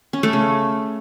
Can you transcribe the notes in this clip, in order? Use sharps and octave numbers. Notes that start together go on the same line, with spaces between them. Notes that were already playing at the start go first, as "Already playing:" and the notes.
C#4
A3
C#3